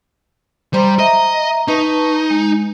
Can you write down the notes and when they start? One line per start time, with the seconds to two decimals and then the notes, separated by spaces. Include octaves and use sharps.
0.74 G3 C5 A#5 C6
0.99 D#5 E5 A#5
1.68 D#4 B4 A5 C#6
2.30 G#3